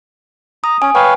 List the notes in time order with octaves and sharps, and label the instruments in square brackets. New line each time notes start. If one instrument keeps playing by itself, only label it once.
[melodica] A#5 [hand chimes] D#6
[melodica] C#4 [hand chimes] G#5
[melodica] B4 C#5 F5 [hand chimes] G5